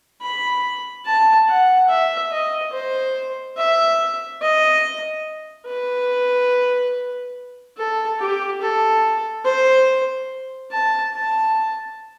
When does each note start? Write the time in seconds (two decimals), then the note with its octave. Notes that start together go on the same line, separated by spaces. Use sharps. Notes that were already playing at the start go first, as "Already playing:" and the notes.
0.22 B5
1.05 A5
1.48 F#5
1.89 E5
2.32 D#5
2.73 C5
3.57 E5
4.42 D#5
5.67 B4
7.78 A4
8.20 G4
8.61 A4
9.45 C5
10.71 A5
11.14 A5